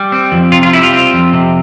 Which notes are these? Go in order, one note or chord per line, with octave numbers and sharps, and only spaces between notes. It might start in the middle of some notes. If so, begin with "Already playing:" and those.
Already playing: G3
C4
F2
C3 F4
F4
G3 E4
F4
C4
F2
C3